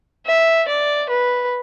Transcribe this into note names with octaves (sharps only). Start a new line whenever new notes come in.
E5
D5
B4